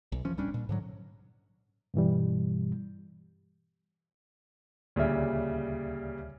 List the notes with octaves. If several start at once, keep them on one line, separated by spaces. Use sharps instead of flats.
B1
F#1 E3 F3 C#4
D1 G3 C#4 D4
A#2
G#2 D3 F#3
G2 B2 E3 G3
D2 A#2 C#3 G3 E5